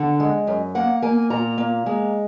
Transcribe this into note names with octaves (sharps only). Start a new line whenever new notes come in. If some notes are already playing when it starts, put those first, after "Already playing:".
Already playing: D3 F#5
G#3
F#2
A#3 F#5
A#3 G#5
A#2 A#5
A#3
G#3